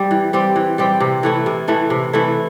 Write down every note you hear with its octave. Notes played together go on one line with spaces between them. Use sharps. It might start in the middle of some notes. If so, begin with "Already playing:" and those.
Already playing: G3 C4 G4
E3
G3 C4 G4
E3
G3 C4 G4
C3
E3 A3 E4
C3
E3 A3 E4
C3
E3 A3 E4